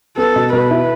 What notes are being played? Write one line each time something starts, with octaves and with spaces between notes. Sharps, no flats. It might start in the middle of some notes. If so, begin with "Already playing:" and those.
B3 A4
B2
B2 B4
E4